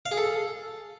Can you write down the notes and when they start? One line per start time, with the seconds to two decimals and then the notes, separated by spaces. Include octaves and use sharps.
0.06 F5
0.12 G#4
0.17 A4